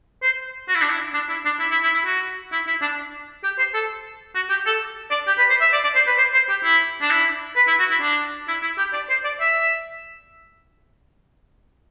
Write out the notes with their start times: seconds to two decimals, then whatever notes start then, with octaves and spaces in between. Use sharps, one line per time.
0.22 C5
0.68 F#4
0.75 E4
0.82 D4
0.90 E4
1.14 D4
1.29 E4
1.45 D4
1.59 E4
1.71 E4
1.83 E4
1.94 E4
2.06 F#4
2.52 E4
2.67 E4
2.81 D4
3.44 G4
3.58 C5
3.74 A4
4.35 F#4
4.49 G4
4.66 A4
5.11 D5
5.27 G4
5.37 B4
5.50 C5
5.60 E5
5.73 D5
5.84 D5
5.95 C5
6.07 B4
6.18 C5
6.34 C5
6.49 G4
6.63 E4
7.01 D4
7.10 E4
7.56 B4
7.67 E4
7.79 F#4
7.90 E4
8.01 D4
8.48 E4
8.62 E4
8.78 G4
8.93 D5
9.09 C5
9.24 D5
9.40 E5